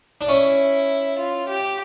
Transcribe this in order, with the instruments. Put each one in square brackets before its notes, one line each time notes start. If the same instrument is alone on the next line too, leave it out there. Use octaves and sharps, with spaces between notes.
[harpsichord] D4
[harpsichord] C#4 [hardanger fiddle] E4
[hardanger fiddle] F4
G4